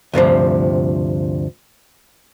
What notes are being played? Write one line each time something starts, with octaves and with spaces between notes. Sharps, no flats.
D2 G2 C3 F3